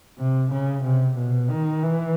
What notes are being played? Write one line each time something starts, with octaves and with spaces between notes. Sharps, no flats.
C3
C#3
C3
B2
D#3
E3